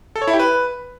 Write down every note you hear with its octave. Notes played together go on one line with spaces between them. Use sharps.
A4
C#5
E4
G4
B4